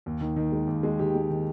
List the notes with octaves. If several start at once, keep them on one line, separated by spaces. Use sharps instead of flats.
D#2
D#3
D#3
G#3
D#2
G#3
D#3 G4
G#3
D#3